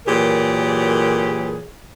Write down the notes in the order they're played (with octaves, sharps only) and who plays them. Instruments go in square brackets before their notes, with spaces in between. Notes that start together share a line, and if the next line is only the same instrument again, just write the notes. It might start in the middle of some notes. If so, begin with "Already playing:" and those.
[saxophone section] A#2 E3 F#3 G4 G#4 A#4